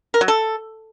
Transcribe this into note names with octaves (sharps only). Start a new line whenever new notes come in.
A#4
F#3
A4